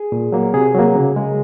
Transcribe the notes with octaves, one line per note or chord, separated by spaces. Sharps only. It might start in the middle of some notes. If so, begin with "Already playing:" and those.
Already playing: G#4
A#2
F#3 A#3
C3 G#4
F#3 A#3
C#3
G#3